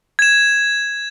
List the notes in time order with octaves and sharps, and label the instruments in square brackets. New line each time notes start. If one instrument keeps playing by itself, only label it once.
[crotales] G#6 E7